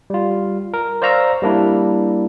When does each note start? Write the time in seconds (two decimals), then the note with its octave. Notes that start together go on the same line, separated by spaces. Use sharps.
0.10 G3 F4
0.74 A#4
1.02 C5 D5 F5 A#5 C#6 E6
1.42 G3 A#3 D4 E4